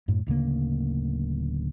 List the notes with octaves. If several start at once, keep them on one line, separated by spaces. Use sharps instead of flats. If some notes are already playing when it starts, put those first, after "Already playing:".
F#2 A2
D1 D2 C#3 A#3